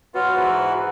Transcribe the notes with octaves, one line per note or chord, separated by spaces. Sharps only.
F#3 B3 F4 F#4
G#2 E3